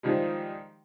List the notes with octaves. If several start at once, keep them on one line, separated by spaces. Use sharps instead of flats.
D#3 F3 G3 G#3